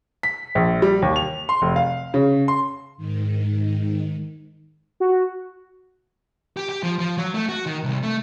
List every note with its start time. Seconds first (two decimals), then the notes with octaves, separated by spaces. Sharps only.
0.23 B6
0.55 A#1
0.82 G3
1.02 D#2
1.16 F7
1.49 C6
1.62 F1
1.76 F5
2.14 C#3
2.48 C6
2.97 G#2 D#3
5.00 F#4
6.57 G4
6.69 G4
6.83 F3
6.99 F3
7.18 F#3
7.34 A3
7.49 F#4
7.66 D#3
7.84 C2
8.03 A3